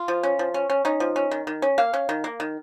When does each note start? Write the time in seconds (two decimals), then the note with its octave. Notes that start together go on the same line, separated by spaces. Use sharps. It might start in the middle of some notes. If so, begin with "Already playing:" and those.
Already playing: F4
0.08 F3
0.23 C#4
0.39 F3
0.54 C#4
0.70 C#4
0.85 C#4 D#4
1.00 F3
1.16 C#4
1.31 D#3
1.47 D#3
1.62 C#4
1.78 A#3 F5
1.93 C#4
2.09 D#3
2.24 A#3
2.40 D#3